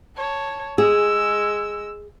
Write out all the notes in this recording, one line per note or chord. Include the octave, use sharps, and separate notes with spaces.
C#5 A5
G#3 G#4 E6